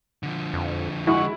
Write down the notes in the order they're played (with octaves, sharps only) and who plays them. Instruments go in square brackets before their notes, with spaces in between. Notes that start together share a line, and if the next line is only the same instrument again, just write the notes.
[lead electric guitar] D3 F3
[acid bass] F2
[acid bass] G#3 [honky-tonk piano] E4 [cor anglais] F#4